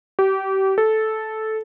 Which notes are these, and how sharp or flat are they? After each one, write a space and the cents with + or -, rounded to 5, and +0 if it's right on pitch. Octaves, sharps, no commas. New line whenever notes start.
G4 -30
A4 -10